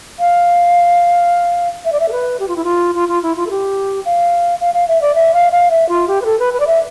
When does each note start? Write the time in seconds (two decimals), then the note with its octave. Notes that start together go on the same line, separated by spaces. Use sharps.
0.19 F5
1.85 E5
1.92 D5
2.00 E5
2.08 A4
2.12 B4
2.40 G4
2.48 F4
2.56 E4
2.64 F4
2.95 F4
3.09 F4
3.23 E4
3.36 F4
3.47 A4
3.51 G4
4.05 F5
4.61 F5
4.74 F5
4.88 E5
5.02 D5
5.15 E5
5.34 F5
5.52 F5
5.71 E5
5.89 F4
6.08 G4
6.22 B4
6.25 A4
6.40 B4
6.54 B4
6.60 D5
6.67 E5